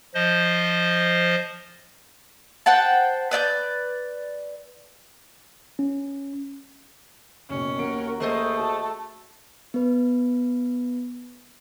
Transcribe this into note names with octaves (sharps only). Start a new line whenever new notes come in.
F3 C5 D#5
C5 F#5 G5 A5
B4 D5 E5 G6
C#4
F#1 B1 C#4
D#2 F#4 A#4 D7
D#2 A3 G#4 A#4 C5 D#5
F#4 A5
B3 B4